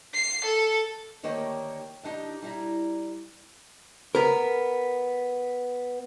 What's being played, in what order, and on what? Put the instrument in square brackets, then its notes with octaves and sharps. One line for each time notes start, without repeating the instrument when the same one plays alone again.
[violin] C7
A4
[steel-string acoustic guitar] D2 D#3 A#3 G4 C#5 G5
D#3 D4 D#4 G4
G3 E4 A#5
[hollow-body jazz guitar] B3 A#4